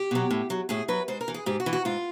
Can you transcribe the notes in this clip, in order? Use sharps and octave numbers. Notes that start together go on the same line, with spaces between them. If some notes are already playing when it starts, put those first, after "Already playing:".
Already playing: G4
B2 F#3
A2
F#3
A2 G#4
F#3 B4
G#2 C5
A#4
E3
G#4
G#2 G4
F#4
E3
F#4
G#2 F4